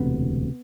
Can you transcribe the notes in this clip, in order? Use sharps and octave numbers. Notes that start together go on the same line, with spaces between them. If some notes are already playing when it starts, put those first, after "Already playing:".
Already playing: E1 D2 C3 B3